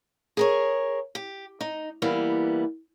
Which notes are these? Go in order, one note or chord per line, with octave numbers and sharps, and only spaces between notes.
G#4 A#4 C#5
G4
D#4
E3 G3 A#3 B3